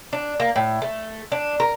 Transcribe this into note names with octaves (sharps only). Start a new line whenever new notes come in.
D4
A#3
A2
A3
D4
A#4